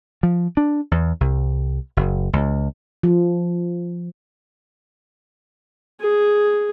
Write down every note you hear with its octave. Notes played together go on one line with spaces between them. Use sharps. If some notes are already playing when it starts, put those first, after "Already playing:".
F3
D4
E2
C2
F#1
C#2
F3
G#4